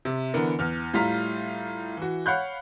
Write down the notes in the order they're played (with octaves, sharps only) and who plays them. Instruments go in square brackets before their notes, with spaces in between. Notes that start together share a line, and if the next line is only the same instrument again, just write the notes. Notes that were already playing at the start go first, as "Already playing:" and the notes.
[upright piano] C3
D3 E3 B3 A#4
E2 F6
A2 G3 F4 A#5 B6
E3 F#4
C#5 F5 F#5 B5 F#6 G6